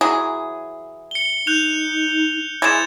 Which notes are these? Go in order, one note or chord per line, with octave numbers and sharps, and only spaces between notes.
E3 F#3 G#4
C#7 G7
D#4 F#6 G6 F7
E3 G#3 G#6 A6 E7